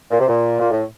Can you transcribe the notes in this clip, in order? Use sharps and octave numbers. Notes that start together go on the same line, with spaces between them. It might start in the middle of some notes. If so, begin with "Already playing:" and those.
A#2
C3
A#2
A#2
A2